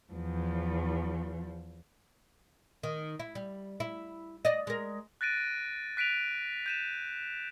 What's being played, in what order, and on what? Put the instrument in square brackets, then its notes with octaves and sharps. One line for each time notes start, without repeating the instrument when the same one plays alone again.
[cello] E2 F3
[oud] D#3
E4
G3
E4
D5 D#5
G#3 A#4
[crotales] F#6 A6 A#6 D7 D#7
F#6 B6 D7 D#7 F7
G6 D#7 E7